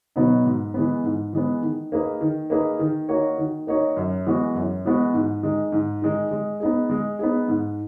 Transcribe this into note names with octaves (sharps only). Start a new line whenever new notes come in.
B2 F#3 B3 D#4
G#2
E3 G#3 B3
G#2
E3 G#3 B3
D#3
A#3 D#4 G#4 B4
D#3
A#3 D#4 G#4 B4
D#3
A#3 D#4 F#4 C#5
D#3
A#3 D#4 F#4 C#5
F#2
E3 G#3 B3 F#4
F#2
E3 G#3 B3 F#4
G#2
D#3 G#3 D#4
G#2
D#3 G#3 D#4
G#3
B3 D#4 G#4
G#3
B3 D#4 G#4
G#2